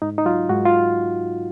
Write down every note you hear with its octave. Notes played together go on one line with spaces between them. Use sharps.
G#2 D#4
D#4
F#3 F4
G#2 F#4
F4